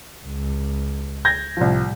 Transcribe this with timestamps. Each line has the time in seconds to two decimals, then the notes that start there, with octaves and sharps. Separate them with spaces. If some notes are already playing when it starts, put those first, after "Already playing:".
0.25 C#2
1.25 G6 G#6 A#6
1.57 C2 A2 F3 G3